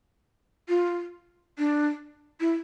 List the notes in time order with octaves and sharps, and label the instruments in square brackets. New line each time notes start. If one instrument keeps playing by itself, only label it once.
[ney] F4
D4
E4